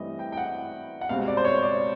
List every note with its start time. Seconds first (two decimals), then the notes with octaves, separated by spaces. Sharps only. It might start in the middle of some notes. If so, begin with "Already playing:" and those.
Already playing: G2 E3 A3 C4 D#5
0.19 G5
0.32 G5
0.37 F#5
1.01 F#5
1.09 C#2 B2 G3 C4 F5
1.28 D5
1.37 C5
1.45 C#5
1.63 D5